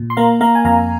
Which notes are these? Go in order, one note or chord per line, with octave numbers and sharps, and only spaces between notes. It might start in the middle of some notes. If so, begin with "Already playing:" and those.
Already playing: A#2
C6
A#3 F5 A#5
A#3 F5 A#5
G#5
F2 F5 A#5